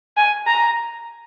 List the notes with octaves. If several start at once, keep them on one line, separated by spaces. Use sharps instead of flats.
G#5
A#5